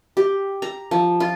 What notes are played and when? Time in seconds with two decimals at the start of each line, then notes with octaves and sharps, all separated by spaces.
0.17 G4
0.62 A#5
0.91 F3
1.20 F4